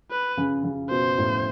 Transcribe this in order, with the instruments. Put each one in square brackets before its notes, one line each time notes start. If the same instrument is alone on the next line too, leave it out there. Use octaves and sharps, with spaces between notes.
[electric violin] B4
[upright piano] C#3
C#3
[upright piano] B2 [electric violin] C5
[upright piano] A2